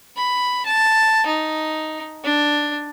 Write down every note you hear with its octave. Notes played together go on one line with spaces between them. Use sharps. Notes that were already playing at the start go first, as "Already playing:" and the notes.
B5
A5
D#4
D4